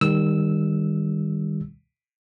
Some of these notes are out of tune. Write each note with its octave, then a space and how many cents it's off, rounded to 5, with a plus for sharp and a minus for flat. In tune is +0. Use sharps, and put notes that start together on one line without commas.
D#3 +0 G3 +25 E6 -10